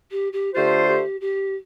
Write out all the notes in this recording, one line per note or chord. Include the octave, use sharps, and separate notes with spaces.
G4
G4
D3 A3 F4 G4 C5
G4
G4